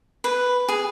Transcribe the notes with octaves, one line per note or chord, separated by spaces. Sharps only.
B4
G#4